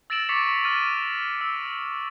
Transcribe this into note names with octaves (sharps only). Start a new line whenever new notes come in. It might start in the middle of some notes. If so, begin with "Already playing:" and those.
E6 A6 A#6 D7 E7 F#7
C#6 D6 A6 B6 C#7 F7
F6 A6 D#7
E6